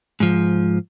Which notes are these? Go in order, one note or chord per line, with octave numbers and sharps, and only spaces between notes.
G#2 F3